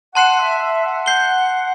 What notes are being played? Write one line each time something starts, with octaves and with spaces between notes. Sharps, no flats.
F#5 A5 C6 F#6 C7 E7
E5
E5
F#5
G6 C7 G7